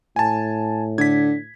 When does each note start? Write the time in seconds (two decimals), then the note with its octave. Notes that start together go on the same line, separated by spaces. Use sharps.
0.16 A2 G#5 A5
0.98 D3 G#6 B6